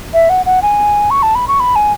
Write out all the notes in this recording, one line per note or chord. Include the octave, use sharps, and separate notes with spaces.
E5
F#5
F#5
G#5
C#6
A5
B5
C#6
B5
G#5